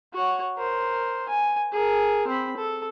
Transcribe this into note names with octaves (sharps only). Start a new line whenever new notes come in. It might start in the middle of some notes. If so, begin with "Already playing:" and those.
F#4 C#5
A#4 C5
G#5
G#4 A#4
C4 B5
A4